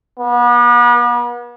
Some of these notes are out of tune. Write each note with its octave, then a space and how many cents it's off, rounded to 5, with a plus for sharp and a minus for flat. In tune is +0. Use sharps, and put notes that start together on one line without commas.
B3 -40